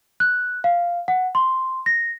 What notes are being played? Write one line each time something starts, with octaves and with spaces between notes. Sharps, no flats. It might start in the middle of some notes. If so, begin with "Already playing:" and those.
F#6
F5
F#5
C6
A#6